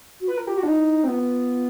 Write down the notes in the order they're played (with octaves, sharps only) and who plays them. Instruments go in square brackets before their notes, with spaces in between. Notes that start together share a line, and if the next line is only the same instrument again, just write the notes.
[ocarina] F#4
[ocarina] F4 [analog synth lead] B4
[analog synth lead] A#4
[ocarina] F4 [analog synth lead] G4
[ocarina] F4 [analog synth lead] F#4
[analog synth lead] D4
[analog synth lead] D#4 [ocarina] E4
[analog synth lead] C4 [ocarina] E4
[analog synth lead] B3 [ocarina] F4